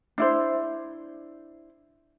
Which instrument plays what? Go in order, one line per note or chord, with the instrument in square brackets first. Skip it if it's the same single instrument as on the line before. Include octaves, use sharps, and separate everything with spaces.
[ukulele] D4 E4 C5